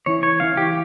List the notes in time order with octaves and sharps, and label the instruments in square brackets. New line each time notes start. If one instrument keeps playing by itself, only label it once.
[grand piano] E3 [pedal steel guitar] C#5
[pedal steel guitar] C#5
[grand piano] E3 [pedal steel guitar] F5
[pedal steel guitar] G4